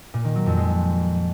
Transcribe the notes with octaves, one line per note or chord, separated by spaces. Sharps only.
A#2
D#3
F#3
F2
G#3